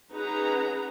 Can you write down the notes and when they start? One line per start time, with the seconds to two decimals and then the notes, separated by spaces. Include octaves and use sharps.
0.12 C#4 D#4 G#4 B4 F#5 A#5